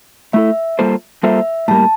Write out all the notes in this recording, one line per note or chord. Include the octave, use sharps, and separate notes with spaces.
A3 E4 A4 E5
G3 A#3 F4 A4 C5
G3 A#3 F4 A4 C5 E5
A2 G3 A#3 A5